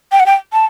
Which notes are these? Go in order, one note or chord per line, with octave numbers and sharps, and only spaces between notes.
G5
F#5
G5
A5